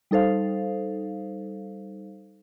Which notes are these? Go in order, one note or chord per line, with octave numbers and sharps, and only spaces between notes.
G3 D#4 A4 C5 F5